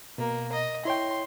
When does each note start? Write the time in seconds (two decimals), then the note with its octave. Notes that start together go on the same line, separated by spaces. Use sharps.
0.18 B2 A#3
0.52 D#5
0.85 E4 C#5 G5 C6